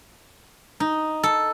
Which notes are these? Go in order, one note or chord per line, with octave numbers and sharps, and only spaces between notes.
D#4
A4